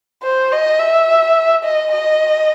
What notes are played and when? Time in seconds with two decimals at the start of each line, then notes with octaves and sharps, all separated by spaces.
0.23 C5
0.52 D#5
0.80 E5
1.64 D#5
1.92 D#5